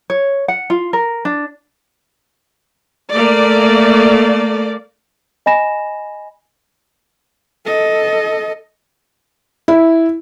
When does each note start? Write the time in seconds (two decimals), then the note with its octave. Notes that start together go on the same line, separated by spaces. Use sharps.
0.10 C#5
0.48 F#5
0.70 F4
0.93 A#4
1.25 D4
3.14 A3 A#3 D5
5.46 D#5 G#5 B5 A#6 E7
7.66 A4 D#5
9.68 E4